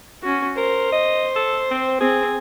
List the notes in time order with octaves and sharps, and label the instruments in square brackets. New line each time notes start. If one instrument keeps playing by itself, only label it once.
[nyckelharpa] C#4 F#4
[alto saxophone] A#4 [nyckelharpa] C5
[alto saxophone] D#5
A4
C4
[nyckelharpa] C4 [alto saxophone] G#4